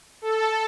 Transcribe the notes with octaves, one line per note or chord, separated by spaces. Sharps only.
A4